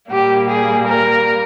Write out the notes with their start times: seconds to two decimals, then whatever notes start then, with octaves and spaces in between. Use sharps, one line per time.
0.10 A#2 G3 A#3 G4
0.48 G#4
0.87 A#4